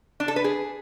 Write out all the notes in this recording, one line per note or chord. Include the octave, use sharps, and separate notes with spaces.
D4
A4
B4
G#4